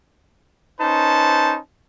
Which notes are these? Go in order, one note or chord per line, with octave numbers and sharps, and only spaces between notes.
C#4 D#4 B4 C5 A5